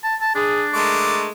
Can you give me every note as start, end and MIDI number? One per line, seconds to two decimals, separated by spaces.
0.03 0.15 81
0.21 0.33 81
0.35 1.26 62
0.35 0.65 68
0.74 1.29 56
0.74 1.29 57
0.74 1.29 70
0.74 1.29 86